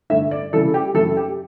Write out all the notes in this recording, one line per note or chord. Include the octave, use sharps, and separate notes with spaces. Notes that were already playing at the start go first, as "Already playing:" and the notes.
G2 D3 A3 E5
D5
C#3 E3 G3 A4
G4
F#2 C#3 E3 A3 E4 A4
G4